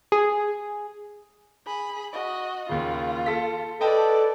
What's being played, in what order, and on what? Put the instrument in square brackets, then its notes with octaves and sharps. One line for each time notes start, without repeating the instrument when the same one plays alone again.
[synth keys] G#4
[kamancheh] G#4 B5
F#4 D#5
[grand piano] D#2 C#3 [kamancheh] F4
[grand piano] A4 B6
[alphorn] A4 [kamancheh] B4 D5 [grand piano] D#5 G5 A5